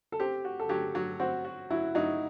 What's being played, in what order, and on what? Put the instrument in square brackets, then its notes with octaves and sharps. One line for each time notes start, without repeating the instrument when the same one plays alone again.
[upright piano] A4
[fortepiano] C4 [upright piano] G4
[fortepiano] F#4
[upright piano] A4
[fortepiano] F#3 [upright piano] G4
[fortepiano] F#3
[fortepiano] C4 [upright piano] F#4
[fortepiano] F#4
[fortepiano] F#3 [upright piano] E4
[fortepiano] F#3 [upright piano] D#4